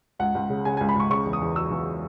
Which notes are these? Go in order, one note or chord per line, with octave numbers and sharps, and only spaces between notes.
C#2 F#5
C#2
C#3
C#3 G#5
G#5
C#2
B5
C#2 C#6
C#3 C#6
E2
D#6
E2
F#3 E6
E2